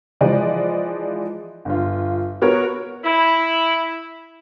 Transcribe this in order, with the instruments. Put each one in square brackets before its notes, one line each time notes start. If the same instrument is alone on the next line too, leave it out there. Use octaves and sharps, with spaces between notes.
[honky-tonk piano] E3 F3 G#3 D5 D#5
G1 F4
B3 F#4 A#4 C#5
[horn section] E4